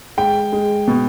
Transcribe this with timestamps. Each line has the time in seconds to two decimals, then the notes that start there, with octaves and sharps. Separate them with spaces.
0.17 G#3 G5
0.53 G#3
0.87 B2